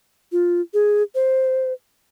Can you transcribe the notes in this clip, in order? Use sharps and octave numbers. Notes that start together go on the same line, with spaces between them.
F4
G#4
C5